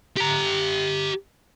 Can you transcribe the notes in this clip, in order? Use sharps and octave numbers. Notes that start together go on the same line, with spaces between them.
G4 A#5